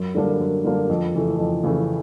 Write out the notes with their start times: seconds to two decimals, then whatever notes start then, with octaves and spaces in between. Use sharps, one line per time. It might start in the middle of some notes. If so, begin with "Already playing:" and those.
Already playing: F#2
0.15 D3 G3 A#3 D4
0.40 F#2
0.64 D3 G3 A#3 D4
0.89 F2
1.14 C#3 E3 A3
1.39 F2
1.64 C#3 E3 A3